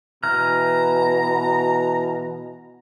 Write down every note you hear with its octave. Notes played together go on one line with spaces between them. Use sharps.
B2 E3 A#5 F6